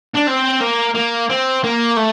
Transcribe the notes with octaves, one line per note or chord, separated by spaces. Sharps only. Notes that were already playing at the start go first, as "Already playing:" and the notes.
D4
C4
A#3
A#3
C4
A#3
A3